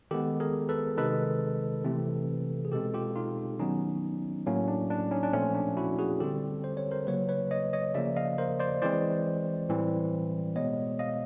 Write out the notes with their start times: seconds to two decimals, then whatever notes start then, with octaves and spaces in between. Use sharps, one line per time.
0.11 D#3 G#3 B3 G4 A4
0.40 G#4 A#4
0.69 A4 B4
0.98 C3 D#3 G#3 A4 B4
1.84 C3 E3 A3 C4
2.65 G#4
2.72 B2 G#3 C4 G4 A4
2.94 F4 G4
3.16 D#4 F4
3.59 D#3 F#3 B3 C#4 D#4
4.46 A2 F#3 A#3 C#4
4.68 D4
4.90 D4
5.11 C#4 D#4
5.23 D4
5.33 A#2 F3 A3 C4 C#4
5.55 D4
5.77 E4 F#4
5.98 F#4 G#4
6.20 D3 G3 C4 G4 A4
6.64 C5
6.77 C#5
6.91 A#4 C5
7.07 C#3 F#3 A#3 B4 C#5
7.29 B4 C#5
7.51 C#5 D#5
7.73 C#5 D#5
7.94 C#3 F3 A#3 D5 E5
8.16 D#5 F5
8.38 A#4 C5
8.59 C5 D5
8.82 E3 G#3 C4 C5 D5
9.69 A2 E3 G3 C4
10.56 B2 G#3 B3 C#5 D#5
10.99 D#5 F5